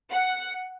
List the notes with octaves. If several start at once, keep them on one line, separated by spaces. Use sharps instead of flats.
F#5